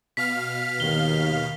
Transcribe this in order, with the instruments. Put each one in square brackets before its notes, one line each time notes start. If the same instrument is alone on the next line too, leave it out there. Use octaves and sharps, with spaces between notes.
[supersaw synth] B2 F5 F6 [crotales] B6
[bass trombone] D#2 [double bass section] D#3 [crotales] G7